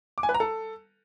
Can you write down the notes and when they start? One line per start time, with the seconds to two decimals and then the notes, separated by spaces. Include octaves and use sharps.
0.18 D6
0.23 G#5
0.29 B4
0.34 A#5
0.40 A4